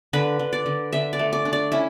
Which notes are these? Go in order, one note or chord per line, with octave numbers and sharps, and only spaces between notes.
D3 B4
D3
D5
D3
D3 E5
D5
A3
D5
D4
D5
C#4 E4